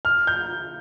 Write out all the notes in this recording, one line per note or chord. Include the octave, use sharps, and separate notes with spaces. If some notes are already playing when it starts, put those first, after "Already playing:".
F6
G6